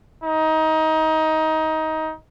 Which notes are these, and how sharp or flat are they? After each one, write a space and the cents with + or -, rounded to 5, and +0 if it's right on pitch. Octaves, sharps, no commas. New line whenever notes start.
D#4 +20